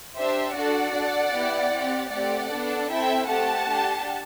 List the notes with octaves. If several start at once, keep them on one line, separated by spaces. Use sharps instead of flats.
D4 G4 C5 E5
D4 F#4 A4 D5 F#5
D4 A4
B3 E4 G4
C4 G4
A3 C4 G4 D5 F#5
B3 D4 A4
C4 E4 A4 E5 G5
A3 C4 G4 F#5 A5
D4 G4